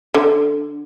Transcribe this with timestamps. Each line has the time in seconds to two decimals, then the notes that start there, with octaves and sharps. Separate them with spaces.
0.14 D3